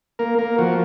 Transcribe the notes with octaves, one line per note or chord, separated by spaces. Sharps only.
A#3 A#4
A#3 A#4
F3 F#4